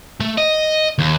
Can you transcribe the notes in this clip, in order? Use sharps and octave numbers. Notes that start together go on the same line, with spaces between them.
A3
D#5
D#2